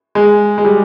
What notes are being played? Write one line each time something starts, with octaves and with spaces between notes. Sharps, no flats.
G#3
G#3
G3